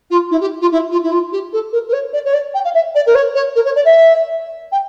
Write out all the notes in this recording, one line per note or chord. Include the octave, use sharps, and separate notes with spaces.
F4
E4
G4
F4
E4
F4
E4
F4
G4
A4
A#4
A#4
C#5
D5
C#5
D5
G5
F5
E5
D5
A#4
C#5
C#5
A#4
C#5
D5
E5
G5